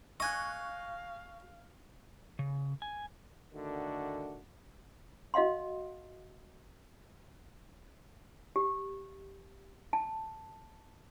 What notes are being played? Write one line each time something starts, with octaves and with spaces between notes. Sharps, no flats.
D#5 F5 G#5 C#6 F#6
C#3
G#5
D3 D#3 A3 D4 F#4
F#4 D#5 F5 F#5 C6
G4
A5